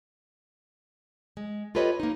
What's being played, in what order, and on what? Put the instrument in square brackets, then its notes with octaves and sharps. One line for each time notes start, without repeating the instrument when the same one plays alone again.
[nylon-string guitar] G#3
F4 G4 A4 B4 C#5 D#5
A#3 D#4